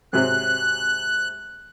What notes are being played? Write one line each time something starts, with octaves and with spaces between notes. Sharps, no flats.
G#2 C3 F#3 F#6